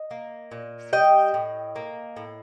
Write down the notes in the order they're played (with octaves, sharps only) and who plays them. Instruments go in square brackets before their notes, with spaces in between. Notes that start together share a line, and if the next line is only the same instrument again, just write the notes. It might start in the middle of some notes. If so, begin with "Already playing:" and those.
Already playing: [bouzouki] D#5
A#3
A#2
G3 D#5 G5
A2
A#3
A2